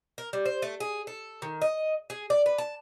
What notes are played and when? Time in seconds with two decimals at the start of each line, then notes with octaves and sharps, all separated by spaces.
0.18 A#4
0.33 G3
0.45 C5
0.62 A3
0.80 G#4
1.07 A4
1.42 D#3
1.62 D#5
2.10 G#4
2.30 D5
2.46 B4
2.58 A5